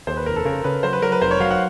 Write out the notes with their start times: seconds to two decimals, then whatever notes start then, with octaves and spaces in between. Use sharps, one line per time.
0.07 D#2 C5
0.17 B4
0.26 F1 A#4
0.36 A4
0.45 C#3 A#4
0.64 C#3 B4
0.83 F#3 C5
0.93 B4
1.02 F#3 A#4
1.12 B4
1.22 F1 C5
1.31 C#5
1.40 F#3 F5
1.50 F#5